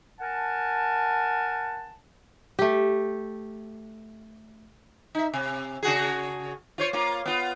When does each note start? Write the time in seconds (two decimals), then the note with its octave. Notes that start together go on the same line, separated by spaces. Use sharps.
0.20 A#4 F#5 G#5 A5
2.59 A3 G4
5.15 D#4 E5
5.34 C3
5.83 C#3 F#4 G#4
6.78 F4 C5 C#5
6.93 A#3 F4
7.26 B3 F4